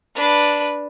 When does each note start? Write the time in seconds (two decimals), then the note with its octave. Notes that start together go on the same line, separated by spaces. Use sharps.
0.15 D4 B4